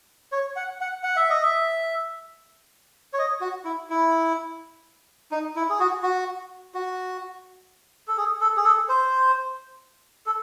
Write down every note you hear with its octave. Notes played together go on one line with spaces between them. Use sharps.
C#5
F#5
F#5
F#5
E5
D#5
E5
C#5
D#5
F#4
E4
E4
D#4
E4
G#4
F#4
F#4
F#4
A4
G#4
A4
G#4
A4
C5
A4